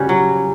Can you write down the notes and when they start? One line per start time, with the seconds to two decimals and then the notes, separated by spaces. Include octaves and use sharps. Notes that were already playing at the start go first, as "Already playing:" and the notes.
Already playing: C#3 G3 C#4 F#4
0.09 F#3